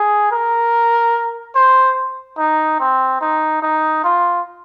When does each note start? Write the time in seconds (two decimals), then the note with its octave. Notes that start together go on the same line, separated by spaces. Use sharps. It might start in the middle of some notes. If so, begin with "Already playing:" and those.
Already playing: G#4
0.31 A#4
1.55 C5
2.38 D#4
2.80 C4
3.21 D#4
3.63 D#4
4.04 F4